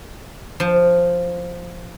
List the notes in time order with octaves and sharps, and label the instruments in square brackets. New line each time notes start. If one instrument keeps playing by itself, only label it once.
[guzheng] F3